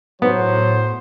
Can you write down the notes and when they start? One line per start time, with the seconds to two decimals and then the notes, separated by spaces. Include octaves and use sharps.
0.22 A2 F#3 B3 C5